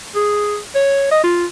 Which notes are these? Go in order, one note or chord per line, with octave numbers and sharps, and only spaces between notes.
G#4
C#5
D#5
F4